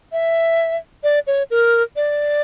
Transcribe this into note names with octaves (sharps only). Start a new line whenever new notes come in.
E5
D5
C#5
A#4
D5